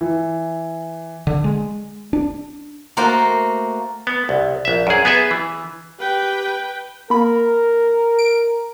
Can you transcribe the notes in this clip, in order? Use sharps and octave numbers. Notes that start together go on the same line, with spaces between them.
E3
D3
G#3
D4
A3 A#3 F#4 C5
B3
C2
A#1 E5
F#2 G#4
B3 G#4 B4 E5
E3
G4 B4 G5
A#3 A#4 B5
D7